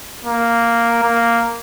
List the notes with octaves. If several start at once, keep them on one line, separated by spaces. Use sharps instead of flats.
A#3
A#3